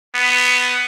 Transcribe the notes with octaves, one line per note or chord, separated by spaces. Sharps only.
B3